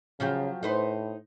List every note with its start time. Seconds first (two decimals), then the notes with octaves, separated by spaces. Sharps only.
0.20 C#3 F3 F#3 G4
0.63 A2 D#4 B4 C5